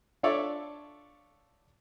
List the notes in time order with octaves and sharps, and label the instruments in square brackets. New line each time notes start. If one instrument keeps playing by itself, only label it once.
[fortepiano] D4 F4 A4 C#5 D5 E5